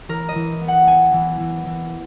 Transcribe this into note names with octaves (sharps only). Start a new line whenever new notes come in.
E3 A#4
D#5
E3
B3
F#5
B3 G#5
E3
E3
E3